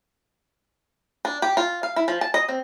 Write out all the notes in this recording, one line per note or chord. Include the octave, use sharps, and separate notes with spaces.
D4
G4
F4
F5
E4
F3
A5
D#5
C4